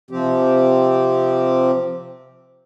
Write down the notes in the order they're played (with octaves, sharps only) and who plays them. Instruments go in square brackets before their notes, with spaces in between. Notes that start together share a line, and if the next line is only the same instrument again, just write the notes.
[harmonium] C3 F3 C4 G4